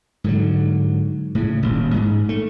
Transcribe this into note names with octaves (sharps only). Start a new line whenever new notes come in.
G#2 D3 F#3
A2 C#3
D#1 A1
G#2
A3